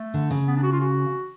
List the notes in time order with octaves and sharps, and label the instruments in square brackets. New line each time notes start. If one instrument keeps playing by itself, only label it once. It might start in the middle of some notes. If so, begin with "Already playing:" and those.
Already playing: [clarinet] A3
[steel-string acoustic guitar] D3
C#3
[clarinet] B3
D4
F#4
F4
F#4